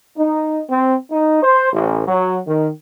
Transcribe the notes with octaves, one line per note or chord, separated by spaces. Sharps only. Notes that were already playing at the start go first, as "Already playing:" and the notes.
D#4
C4
D#4
C5
A1
F#3
D#3